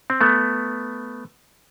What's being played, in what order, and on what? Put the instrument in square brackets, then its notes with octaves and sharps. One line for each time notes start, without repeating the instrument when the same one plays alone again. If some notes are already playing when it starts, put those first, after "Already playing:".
[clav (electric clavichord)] C4
A3 B3